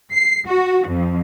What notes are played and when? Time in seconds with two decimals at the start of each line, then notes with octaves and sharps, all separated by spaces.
0.13 C7
0.48 F#4
0.88 F2